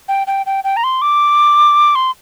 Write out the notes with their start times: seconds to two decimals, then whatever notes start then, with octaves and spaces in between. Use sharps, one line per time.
0.08 G5
0.27 G5
0.46 G5
0.64 G5
0.77 A#5
0.84 C6
1.02 D6
1.95 C6